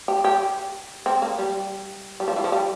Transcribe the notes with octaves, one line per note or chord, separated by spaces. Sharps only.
G4
G4
C4
A#3
G3
G3
F3
E3
F3
G3